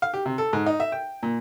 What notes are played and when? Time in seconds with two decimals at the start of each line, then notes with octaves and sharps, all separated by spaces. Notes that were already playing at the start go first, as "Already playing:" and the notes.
0.02 F5
0.14 G4
0.26 C3
0.38 A4
0.53 G#2
0.66 D#4
0.80 E5
0.92 G5
1.23 A#2